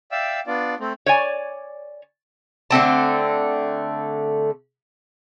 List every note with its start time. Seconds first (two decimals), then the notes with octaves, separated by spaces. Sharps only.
0.12 D5 E5 F5 G5 E6
0.47 B3 D4 F4 D5
0.80 A3 C4
1.06 C#5 D5 G#5
2.71 D3 A3 C4 A5